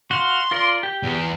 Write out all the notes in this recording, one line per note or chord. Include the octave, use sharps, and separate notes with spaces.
F#4 F5 C6
F4 A#4 D5
G4 G5
E2